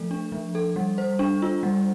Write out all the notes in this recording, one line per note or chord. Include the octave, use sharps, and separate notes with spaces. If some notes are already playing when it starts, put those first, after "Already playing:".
Already playing: F3 A3 A4
D4
F3
A4
G3
C5
D4
F4
G3